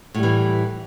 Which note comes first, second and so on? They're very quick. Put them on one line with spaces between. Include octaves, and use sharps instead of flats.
A2 G3 E3